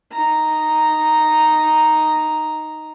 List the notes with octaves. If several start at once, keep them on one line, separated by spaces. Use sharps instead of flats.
D#4 A#5